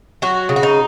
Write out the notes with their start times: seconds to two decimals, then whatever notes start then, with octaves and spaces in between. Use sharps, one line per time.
0.22 F#3 F#4
0.49 C#3
0.56 F#4
0.63 D#4